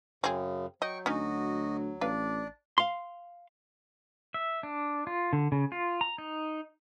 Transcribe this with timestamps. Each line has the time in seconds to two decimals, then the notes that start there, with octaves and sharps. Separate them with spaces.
0.24 F#2 C#3 C4 G#4
0.82 F#3 D#5 G5 C#6
1.06 D2 C#4 D#4 F#4 D#5
2.01 A1 D4 B4 D5 F5
2.78 F5 C6
4.34 E5
4.63 D4
5.07 F4
5.33 D3
5.52 C#3
5.72 F4
6.01 A#5
6.18 D#4